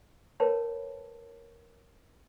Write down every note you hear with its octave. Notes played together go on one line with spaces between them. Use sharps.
A#4 B4 C#5 G5 A5 B5